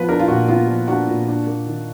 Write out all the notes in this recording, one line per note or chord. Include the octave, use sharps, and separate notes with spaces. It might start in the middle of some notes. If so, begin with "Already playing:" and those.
Already playing: F3 B3 B4
D4 A#4
F4
A#2 F#4
B3 F4
F3
D4 F#4
A#2
D4
A#3
D#3